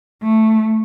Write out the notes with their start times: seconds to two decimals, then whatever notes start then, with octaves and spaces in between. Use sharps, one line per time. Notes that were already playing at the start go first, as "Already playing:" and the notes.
0.23 A3